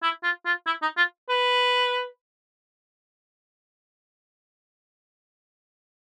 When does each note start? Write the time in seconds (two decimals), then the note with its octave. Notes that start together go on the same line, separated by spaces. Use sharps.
0.03 E4
0.24 F4
0.46 F4
0.67 E4
0.82 D#4
0.97 F4
1.29 B4